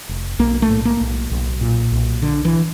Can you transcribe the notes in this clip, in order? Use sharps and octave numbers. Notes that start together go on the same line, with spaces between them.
F1
B1 A#3
A3
A2
A#3
B1
B1
A#2
B1
D3
E3